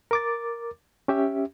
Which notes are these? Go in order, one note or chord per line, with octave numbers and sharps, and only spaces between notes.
A#4 D6 A6
C#4 G4 E5